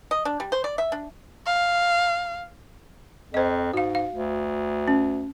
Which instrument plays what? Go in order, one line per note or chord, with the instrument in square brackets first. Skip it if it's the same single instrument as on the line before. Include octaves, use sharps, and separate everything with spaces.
[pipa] D#5
D4
G3
C5
D5
E5
D4
[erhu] F5
[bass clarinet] F2 [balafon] C5 D#5
[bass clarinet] G#2 [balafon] F#4 F5
[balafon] F5
[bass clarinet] D2
[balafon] C#4